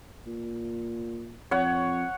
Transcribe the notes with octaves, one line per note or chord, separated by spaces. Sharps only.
A#2
F2 C#5 F#5